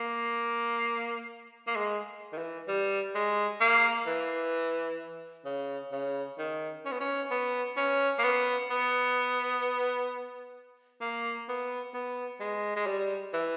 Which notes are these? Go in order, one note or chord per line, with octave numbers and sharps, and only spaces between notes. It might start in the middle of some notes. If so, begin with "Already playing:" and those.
Already playing: A#3
A#3
G#3
D#3
E3
G3
G#3
A#3
E3
C#3
C#3
D#3
C#4
B3
C#4
B3
C#4
A#3
B3
B3
A#3
B3
B3
G#3
G#3
G3
E3